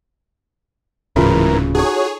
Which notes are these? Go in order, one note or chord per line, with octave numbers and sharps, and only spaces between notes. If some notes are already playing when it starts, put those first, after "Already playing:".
D1 G#2 C#3 E3 F4 F#4 A#4 C#5
D#4 F#4 G#4 A4 C#5